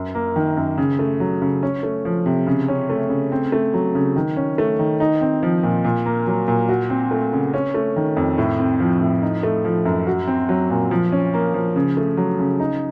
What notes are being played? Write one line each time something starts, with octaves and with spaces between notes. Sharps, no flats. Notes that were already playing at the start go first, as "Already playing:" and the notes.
Already playing: F#2
A#3
D#3
F#2
C#3
A3
F#3
C#3
C#4
A3
F3
C3
C#3
C#4
A3
C#3
C4
A3
F#3
C#3
D#3
C#4
A3
D#3
D#4
C4
F3
A#2
A#2
A#3
F#3
A#2
F#4
C4
A3
C#3
C#4
A3
D#3
F2
A2
C4
F3
A2
D#4
A3
F3
F#2
F#4
C4
F#3
A#2
F3
C#4
A#3
F3
C#3
A3
F#3
C#3
D#4